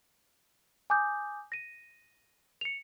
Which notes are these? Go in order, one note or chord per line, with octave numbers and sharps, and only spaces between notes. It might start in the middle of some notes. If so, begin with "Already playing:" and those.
G#5 D6 D#6 G6
A#6 D#7
C#7 F7